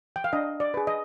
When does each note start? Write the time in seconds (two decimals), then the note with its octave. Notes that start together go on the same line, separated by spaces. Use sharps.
0.16 G5
0.24 F5
0.33 D4 D#5
0.60 D5
0.74 G#4 B4
0.87 D#5